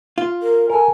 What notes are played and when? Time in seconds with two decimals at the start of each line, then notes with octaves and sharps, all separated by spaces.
0.18 F4
0.42 A#4
0.70 A4 A#4 G#5